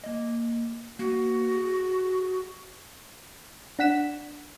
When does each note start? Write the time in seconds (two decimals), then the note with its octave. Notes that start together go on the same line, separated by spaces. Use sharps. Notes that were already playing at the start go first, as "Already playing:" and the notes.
0.04 A#3 D#5
0.99 A#3 B3 F#4
1.51 G#4
3.79 D4 F#5 B6 E7